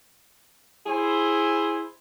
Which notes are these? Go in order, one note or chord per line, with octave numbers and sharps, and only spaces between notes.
E4 G#4 C5